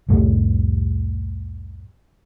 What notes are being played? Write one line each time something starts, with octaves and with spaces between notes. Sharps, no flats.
C2 F2 A2 A3